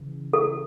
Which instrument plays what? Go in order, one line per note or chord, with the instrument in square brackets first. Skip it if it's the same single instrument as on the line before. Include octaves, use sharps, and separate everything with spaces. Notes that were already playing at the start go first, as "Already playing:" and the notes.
Already playing: [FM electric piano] C#3 E3
[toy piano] A4